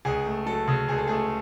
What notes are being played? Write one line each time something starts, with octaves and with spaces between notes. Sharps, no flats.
C#2 G#4
A3
F#3 A4
C#3
C#2 G#4
A4
A3 G#4